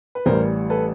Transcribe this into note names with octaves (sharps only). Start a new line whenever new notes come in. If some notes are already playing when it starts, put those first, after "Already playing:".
B4
A1 A2 E3 G3 A#4 C5
A4 B4